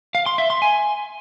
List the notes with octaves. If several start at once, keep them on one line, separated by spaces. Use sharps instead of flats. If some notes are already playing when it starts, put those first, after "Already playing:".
F5
C6
E5
C6
G#5